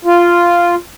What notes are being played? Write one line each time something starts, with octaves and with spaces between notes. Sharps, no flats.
F4